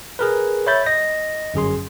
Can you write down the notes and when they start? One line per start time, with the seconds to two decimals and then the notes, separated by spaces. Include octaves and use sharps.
0.19 G#4 A#4 B4
0.66 C#5 E5 B5 G6 A6
0.86 D#5 A#6
1.54 G1 F#2 G#4 C6